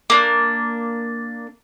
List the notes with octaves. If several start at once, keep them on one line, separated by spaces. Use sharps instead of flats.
A#3 D4